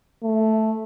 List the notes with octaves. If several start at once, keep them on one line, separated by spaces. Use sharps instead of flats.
A3